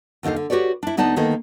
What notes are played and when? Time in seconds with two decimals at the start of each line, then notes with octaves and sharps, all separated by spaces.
0.23 D#2 D3 D#4 A4 F5
0.36 D3
0.50 F#4 G4 B4 C#5 D5
0.83 D4 E4
0.97 D2 B3 D#4 D5 A5
1.16 D2 D#3 A#3 B3 A4 D#5